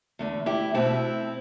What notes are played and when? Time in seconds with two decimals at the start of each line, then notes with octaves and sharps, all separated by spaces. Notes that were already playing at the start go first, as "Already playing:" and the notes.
0.19 E2 D3 A3
0.46 E4 G4
0.74 B2 A3 C4 E4